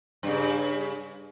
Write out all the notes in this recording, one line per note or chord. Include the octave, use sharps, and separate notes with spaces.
G2 C#3